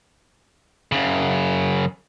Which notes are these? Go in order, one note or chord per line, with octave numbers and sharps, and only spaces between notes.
F#2 C#3